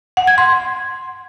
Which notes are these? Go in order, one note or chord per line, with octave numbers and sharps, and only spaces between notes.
F#5
G#6
C6